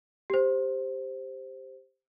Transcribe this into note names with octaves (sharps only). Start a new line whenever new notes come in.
G4 C5